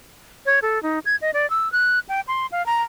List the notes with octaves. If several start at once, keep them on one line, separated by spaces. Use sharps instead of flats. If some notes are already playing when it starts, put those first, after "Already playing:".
C#5
A4
D#4
G#6
D#5
D5
E6
F#6
G5
C6
F5
A#5